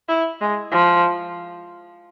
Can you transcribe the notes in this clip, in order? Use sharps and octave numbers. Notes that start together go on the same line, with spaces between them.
E4
G#3
F3